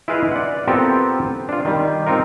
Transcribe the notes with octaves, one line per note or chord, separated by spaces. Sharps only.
E4 F4 G#4 B4 D#5 F5
D5 F#5
B3 C4 F4 G4 A4 A#4
D4 F4
D#3 G3
C4 D#4 F4 A#4